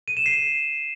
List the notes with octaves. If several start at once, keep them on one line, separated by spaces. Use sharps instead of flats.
D#7
E7
C7